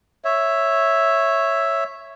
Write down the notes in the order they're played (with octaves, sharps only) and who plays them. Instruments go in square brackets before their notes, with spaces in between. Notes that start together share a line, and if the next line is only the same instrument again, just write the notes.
[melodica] C#5 E5